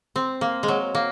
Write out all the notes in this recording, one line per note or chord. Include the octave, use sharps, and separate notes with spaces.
C4
A#3
G#3
F#3
A#3